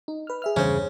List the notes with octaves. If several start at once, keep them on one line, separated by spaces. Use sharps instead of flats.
D#4
B4 F6
G#4 E5 F6
E2 G2 C#3 C#4 C5